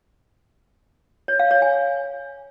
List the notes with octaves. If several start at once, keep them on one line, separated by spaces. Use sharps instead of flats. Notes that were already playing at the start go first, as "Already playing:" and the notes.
C#5
F5
C#5
G#5